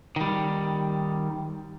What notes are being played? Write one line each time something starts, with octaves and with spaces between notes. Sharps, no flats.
D#3 G3